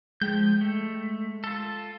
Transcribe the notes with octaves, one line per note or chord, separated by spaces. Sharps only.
F3 G#3 G5 G6
A3
F4 A4